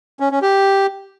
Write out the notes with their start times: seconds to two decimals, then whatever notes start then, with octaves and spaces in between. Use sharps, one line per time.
0.20 C#4
0.31 C#4
0.42 G4